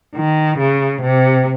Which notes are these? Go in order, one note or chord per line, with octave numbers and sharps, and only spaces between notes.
D#3
C#3
C3